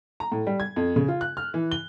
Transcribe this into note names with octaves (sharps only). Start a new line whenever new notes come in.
A#5
A2
G3
G#6
F2
C#3
F4
F#6
F6
E3
G7